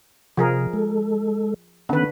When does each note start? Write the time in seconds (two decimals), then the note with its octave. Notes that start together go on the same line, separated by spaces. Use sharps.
0.37 C3 F3 G#4 A#4
0.73 G#3 A4
1.89 D3 D#3 B3 C#4 B4